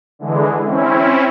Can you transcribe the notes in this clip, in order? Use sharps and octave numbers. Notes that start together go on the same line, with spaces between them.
D3 E3 G#3
C4 C#4 E4